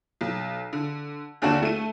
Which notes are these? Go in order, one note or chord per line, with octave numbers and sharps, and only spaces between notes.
B1
D3
D#2 D3 D4 F#4 D7 E7
A3 D#7